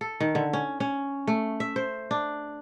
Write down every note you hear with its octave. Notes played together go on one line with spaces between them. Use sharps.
A4
D#3
D3
C#4
C#4
A3
E5
C5
D4